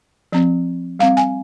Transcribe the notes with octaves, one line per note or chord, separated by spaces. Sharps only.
F3 C4
G3 C4 F5
G#5